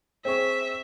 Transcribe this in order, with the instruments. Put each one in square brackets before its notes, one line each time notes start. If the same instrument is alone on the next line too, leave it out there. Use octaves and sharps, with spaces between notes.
[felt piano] C4 G#4 C#6 [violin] E5